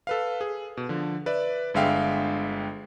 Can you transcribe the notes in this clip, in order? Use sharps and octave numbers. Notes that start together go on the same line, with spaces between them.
A4 B4 F5
G#4
B2
D3 F3
B4 D5 E5
G1 D3 G#3 E5 F5 G5